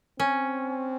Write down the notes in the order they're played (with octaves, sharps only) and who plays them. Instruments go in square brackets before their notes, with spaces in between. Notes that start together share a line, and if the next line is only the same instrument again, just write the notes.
[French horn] C4 [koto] C#4